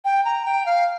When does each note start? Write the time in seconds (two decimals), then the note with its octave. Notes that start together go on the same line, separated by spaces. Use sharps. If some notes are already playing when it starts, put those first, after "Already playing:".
0.05 G5
0.25 A#5
0.45 G5
0.66 F5